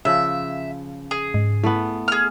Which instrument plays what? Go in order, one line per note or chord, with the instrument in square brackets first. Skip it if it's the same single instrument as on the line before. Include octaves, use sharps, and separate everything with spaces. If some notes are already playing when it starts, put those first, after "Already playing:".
[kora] C#3 F3 [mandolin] E5
[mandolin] G#4
[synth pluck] G#2
[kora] A3 B3 [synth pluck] E4
[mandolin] G#4 F6